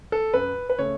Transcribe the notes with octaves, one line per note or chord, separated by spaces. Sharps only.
A4
F#2 B4
B4
C#3 A3 C#5